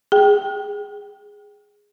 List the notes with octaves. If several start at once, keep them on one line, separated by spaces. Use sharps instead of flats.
G#4 G5